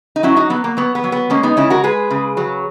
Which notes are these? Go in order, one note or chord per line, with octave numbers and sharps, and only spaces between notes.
D#4
F#3 C#4 E4
D#4 F#4
F#3 B3
A#3
F#3 B3
B3
F#3
B3
G#3 A#3 C#4
B3 D#4
C#3 C#4 E4
F#4 A#4
G#3 G#4 B4
C#3
F#3